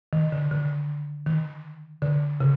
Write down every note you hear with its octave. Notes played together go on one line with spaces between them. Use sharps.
D#3
D3
D3
D#3
D3
C#3